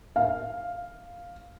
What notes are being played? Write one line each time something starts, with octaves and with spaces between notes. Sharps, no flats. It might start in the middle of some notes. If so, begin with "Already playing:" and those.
F5